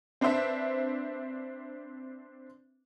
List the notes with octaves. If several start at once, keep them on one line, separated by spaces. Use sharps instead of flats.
C4 D4 B4 C5 E5